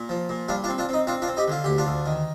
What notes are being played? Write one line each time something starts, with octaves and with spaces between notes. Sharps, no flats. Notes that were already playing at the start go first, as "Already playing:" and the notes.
Already playing: A#2
F3
A#2
G3 D4 F4
D4 F4
C4
D4 F4
C4 D#4
C4 D4 F4
D4 F4
C4
D#4 G4
D3 F4
D2 G4
D4 F4
D2
D#3